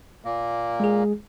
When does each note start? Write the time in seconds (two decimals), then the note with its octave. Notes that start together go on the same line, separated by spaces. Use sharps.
0.25 A#2 A#3
0.80 G#3 G#4